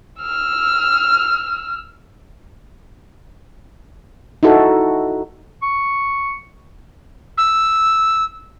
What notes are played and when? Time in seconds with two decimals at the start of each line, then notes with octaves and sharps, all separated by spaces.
0.22 E6 F6
4.43 D#4 E4 F#4 A4
5.62 C#6
7.38 E6